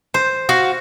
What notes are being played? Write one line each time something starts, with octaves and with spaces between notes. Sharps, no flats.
C5
F#4 F5